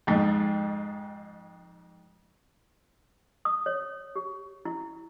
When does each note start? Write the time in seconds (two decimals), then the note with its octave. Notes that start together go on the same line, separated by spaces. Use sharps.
0.07 F2 G#2
3.45 D#6
3.66 C#5
4.16 G4
4.65 E4